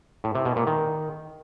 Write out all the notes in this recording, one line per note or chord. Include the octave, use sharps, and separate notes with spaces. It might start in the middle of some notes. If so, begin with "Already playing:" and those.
A2
C3
B2
A#2
D#3